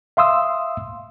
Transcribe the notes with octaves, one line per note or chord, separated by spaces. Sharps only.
E5 F5 C6 D#6 E6